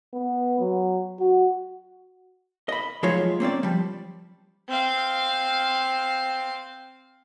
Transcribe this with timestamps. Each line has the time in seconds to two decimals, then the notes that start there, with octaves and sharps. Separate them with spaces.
0.14 B3
0.60 F#3
1.19 F#4
2.69 D#5 B5
3.03 F3 F#3 G#3 A3 F4 C#5
3.40 A#3 C4 C#4 D5
3.63 F3 G3
4.69 C4 F5